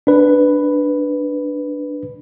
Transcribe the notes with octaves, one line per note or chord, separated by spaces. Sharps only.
D4 B4